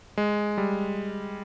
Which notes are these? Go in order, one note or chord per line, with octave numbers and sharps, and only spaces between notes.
G#3
G3